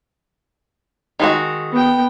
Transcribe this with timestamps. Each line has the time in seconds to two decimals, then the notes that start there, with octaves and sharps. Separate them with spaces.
1.20 D#3 G#3 F#4
1.71 B3 G5